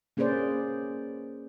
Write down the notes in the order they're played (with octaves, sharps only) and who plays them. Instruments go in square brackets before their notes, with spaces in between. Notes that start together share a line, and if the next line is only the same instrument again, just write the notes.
[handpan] A#3 C#4 G#4 B4 C5 D5